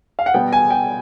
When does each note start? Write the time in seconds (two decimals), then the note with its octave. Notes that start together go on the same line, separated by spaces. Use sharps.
0.19 F5
0.26 F#5
0.34 B2 G3 B3 G5
0.53 G#5
0.70 G5